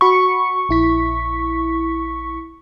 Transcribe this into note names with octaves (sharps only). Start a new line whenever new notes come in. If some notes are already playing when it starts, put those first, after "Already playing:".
F#4 B5 C#6 C#7
A#1 E4 B6